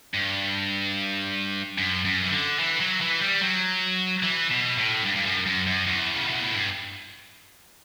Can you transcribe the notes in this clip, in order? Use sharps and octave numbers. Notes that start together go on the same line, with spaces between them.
G2
F#2
F#2
E3
D3
E3
F#3
E3
G3
F#3
E3
B2
A2
F#2
G2
G2
F#2
F#2
F#2
E2
C#3
B2
A2
G2